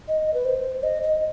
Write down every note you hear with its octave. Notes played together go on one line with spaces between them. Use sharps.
D#5
B4
C5
D#5
D#5